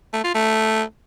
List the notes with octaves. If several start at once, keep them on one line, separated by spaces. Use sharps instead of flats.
A3
F4
A3